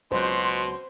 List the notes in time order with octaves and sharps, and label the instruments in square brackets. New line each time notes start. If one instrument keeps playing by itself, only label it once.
[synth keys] C#2 F#3 F#4 [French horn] B2 [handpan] C5 [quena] C6